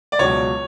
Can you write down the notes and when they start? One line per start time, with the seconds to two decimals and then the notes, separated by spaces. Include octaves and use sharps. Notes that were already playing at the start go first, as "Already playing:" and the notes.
0.12 D5
0.19 C#2 B2 F#3 C#5